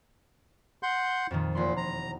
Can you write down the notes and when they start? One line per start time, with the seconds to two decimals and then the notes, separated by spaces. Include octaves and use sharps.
0.83 F#5 C6 G6
1.31 F2 A#2 D#3
1.55 E1 A#2 B5 C6
1.77 A#5